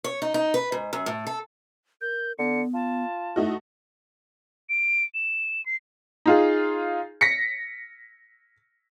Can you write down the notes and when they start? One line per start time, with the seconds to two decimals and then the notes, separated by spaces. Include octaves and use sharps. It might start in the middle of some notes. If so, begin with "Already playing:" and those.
0.04 C#5
0.22 D#4
0.34 D#4
0.54 B4
0.72 G#2
0.93 F#2
1.06 A2
1.27 A4
2.01 A#4 G6
2.39 D3 B3 C#7
2.74 F4 A5
3.36 A3 D#4 E4 F#4
4.69 D7
5.14 E7
5.66 C7
6.26 D#4 F4 G#4
7.21 A#6 B6 C#7